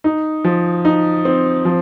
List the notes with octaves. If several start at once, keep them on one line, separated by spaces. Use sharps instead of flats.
D#4
F3
D#4
C4
F3